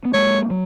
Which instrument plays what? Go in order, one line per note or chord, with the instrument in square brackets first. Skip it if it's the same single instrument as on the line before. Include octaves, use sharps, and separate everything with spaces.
[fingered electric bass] B3
[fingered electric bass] G#3 A#3 [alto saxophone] C#5
[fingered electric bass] F#3